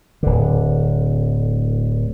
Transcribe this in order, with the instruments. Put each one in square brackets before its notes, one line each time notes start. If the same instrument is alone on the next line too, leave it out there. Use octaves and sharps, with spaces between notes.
[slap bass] D1 D3